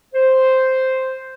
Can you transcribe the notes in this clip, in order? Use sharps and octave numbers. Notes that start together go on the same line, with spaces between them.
C5